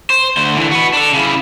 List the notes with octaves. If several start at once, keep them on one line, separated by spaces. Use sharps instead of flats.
C5
D2 C5
D3 E3
F#4 B4
D4 A4
C#3 E4